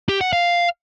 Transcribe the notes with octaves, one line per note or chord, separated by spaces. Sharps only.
G4
F#5
F5